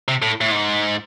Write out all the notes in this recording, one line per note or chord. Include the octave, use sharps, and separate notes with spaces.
C3
A2
A2
G#2